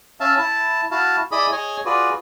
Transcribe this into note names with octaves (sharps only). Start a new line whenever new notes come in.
C#4 E5 F5 A5
E4 A5
E4 F#4 F5 A5
E4 G#4 D5 D#5 B5
G#4 C#5 D#5 G#5
F4 F#4 G#4 B4 D5